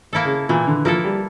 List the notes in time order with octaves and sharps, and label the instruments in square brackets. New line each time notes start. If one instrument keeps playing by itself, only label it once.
[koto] A#3 E4 A4
[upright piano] C#3
[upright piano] A#2 [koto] E3
[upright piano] D3
[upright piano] F3 [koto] A#3 E4 A4
[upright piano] G3